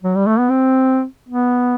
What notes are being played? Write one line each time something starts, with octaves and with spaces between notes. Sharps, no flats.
F#3
G3
A3
B3
C4
B3